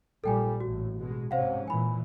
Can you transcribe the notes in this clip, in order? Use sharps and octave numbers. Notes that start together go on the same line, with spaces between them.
A#1 A#2 G3 A4 G5 G#5
A1 A2 F#4
B2 G#3
G#2 C3 C#4 C5 F5 F#5
A#2 E3 G#5 B5